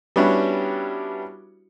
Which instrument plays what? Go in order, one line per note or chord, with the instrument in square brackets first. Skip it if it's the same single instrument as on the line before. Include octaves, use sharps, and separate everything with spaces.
[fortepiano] G3 B3 C#4 D4 E4 F#4